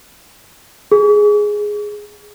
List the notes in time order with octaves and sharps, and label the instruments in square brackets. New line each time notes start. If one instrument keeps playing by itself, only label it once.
[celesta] G#4